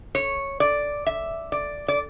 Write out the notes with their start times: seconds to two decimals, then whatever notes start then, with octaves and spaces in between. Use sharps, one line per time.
0.15 C#5
0.60 D5
1.06 E5
1.52 D5
1.88 D5